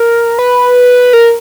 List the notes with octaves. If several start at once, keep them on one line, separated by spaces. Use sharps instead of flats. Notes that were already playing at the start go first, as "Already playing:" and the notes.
Already playing: A#4
B4
A#4